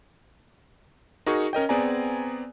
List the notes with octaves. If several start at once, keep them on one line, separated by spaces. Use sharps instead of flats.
D#4 F#4 G#4 A#4 C#6
C#4 A#4 D#5 G5
B3 C4 G#4 D5 G#5 A#5